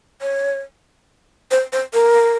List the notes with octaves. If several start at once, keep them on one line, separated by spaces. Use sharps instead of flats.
C#5
C5
C5
A#4